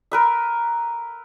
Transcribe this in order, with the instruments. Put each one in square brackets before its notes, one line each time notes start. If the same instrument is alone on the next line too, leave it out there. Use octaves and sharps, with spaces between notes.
[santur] A#4 B4 E5